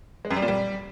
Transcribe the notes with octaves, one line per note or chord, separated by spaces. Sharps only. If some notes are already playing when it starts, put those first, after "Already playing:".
G#3
F#2
G3
A#2
G3